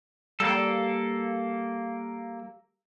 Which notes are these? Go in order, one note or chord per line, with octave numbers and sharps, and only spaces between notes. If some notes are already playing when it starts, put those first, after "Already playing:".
G3 A#3 A4